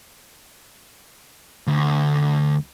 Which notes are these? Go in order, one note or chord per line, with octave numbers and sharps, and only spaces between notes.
D2